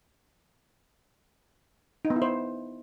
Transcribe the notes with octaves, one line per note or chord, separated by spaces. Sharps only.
D#4
B3
E4
C5